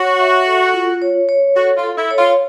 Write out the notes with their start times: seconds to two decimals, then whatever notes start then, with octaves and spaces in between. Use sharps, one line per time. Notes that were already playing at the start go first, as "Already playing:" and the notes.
Already playing: F#4 C#5
0.19 E5
0.46 A4
0.74 F4
1.02 C#5
1.29 C#5
1.56 F#4 A4
1.76 F4
1.83 A4
1.98 E4
2.11 C#5
2.18 F4